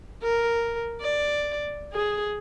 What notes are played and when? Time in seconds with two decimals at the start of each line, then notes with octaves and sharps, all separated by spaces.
0.22 A#4
1.01 D5
1.93 G#4